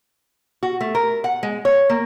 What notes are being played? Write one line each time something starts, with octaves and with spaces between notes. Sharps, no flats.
F#4
A3
A#4
F#5
G#3
C#5
A#3